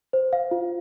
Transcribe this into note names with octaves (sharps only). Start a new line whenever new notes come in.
C5
F5
F4